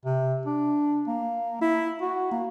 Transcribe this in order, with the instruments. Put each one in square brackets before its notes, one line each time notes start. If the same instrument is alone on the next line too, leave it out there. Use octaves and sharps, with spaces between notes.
[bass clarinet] C3
D4
A#3
E4
F#4
A#3